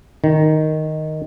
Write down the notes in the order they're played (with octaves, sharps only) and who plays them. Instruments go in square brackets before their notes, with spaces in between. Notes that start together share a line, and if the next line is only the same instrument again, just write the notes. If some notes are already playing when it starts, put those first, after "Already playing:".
[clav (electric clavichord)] D#3